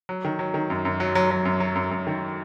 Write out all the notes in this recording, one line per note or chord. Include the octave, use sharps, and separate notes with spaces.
F#3
D#3
F#3
D#3
F#2
F#2
F#3
F#3
F#3
F#2
F#3
F#2
F#2
D#3